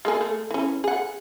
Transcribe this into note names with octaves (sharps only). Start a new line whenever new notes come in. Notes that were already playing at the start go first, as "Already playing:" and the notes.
G#3 A#3 G#4
A3
E3 C#4
G#4 F#5